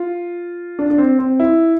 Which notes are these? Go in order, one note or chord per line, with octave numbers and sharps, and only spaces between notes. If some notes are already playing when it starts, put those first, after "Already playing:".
Already playing: F4
D4
D4
C4
C4
E4